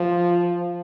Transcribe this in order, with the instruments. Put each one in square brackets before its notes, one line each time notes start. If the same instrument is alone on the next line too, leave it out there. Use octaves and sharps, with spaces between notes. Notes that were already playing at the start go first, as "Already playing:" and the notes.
Already playing: [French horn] F3